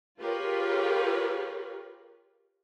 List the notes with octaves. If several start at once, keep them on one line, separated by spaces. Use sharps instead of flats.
F4 G4 G#4 A#4 B4 C#5